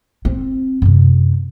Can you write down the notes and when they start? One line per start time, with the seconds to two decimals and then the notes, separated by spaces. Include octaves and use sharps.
0.25 C4
0.82 F#2 C3